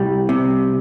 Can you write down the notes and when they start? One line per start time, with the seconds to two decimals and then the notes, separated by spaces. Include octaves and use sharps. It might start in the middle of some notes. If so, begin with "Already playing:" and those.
Already playing: C2 G3
0.29 C3